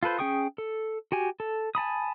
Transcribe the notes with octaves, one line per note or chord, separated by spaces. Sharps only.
F4 A4 B4 C5
C#4 G#4 G5 C#6 D#6
A4
F#4 G4 G#5
A4
G#5 A5 B5 D#6